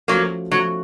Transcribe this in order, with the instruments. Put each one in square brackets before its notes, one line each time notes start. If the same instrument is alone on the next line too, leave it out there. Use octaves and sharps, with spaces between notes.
[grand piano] F3 A3 C#4 F#4 [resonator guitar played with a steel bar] F#3 A#3
[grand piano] F3 A3 C#4 F#4 [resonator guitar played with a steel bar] F#3